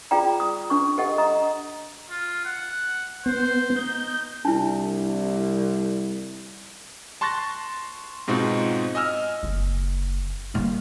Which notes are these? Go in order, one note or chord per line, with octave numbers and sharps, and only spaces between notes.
F4 G#4 D5 G5 A#5
D#6
D4 C#6
G4 A4 D#5 F#5
D#5 A#5 D#6
F4
F#5
B3 C5
D#4 G6
C2 D4 E4 A5
A5 C6 C#6 F#6 A6 A#6
G#2 B2 C4 D#4 F4 F#4
D#5 G#5 E6 F6
F#1
G3 A#3